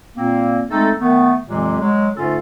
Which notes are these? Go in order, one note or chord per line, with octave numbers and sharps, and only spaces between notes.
A#2 A#3 C4
G#3 A3 C4 D#4 A4
D#3 A3 B3
F2 A#2 E3 F#3 G#3 G4
F#3 G#3
G#2 D3 A3 C#4 F4 A4